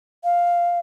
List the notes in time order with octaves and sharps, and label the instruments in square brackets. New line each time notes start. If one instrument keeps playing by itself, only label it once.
[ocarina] F5